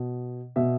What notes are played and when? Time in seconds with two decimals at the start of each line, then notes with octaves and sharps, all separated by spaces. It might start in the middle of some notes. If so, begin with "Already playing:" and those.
Already playing: B2
0.56 B2 E5